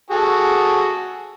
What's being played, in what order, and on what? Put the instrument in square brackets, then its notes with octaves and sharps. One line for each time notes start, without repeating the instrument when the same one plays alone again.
[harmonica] F#4 G#4 A4